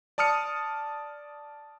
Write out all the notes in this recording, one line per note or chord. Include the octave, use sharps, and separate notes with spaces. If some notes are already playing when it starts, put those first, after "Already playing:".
D5 A5 D#6 F6 C#7